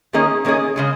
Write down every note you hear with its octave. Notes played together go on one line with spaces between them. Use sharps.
D#3 A#3 C#4 G#4 D#5
D#3 A#3 C#4 G#4 D#5
C#3 G#3 C#4